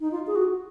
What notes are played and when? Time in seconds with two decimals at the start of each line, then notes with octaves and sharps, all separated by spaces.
0.01 D#4
0.12 F4
0.27 G#4
0.36 F#4